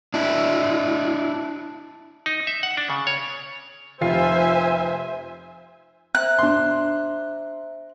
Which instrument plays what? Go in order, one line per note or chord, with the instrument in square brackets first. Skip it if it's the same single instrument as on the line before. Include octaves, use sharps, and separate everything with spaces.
[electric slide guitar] D4 E4
[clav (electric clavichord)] D#4
E5
F#5
D4
C#3
C#5
[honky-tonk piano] F1 F4 C7 [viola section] C5 E5 G#5
[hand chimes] C5 E5 A#5 [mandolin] F#6
[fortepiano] D4 C6